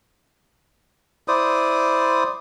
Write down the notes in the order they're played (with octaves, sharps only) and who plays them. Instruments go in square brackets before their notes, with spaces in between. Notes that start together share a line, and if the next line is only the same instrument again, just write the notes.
[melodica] E4 C5 D5 D#6